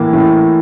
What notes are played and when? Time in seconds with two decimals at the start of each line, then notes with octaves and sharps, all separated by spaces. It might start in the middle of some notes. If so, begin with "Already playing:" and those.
Already playing: A2 E3 A#3
0.13 A2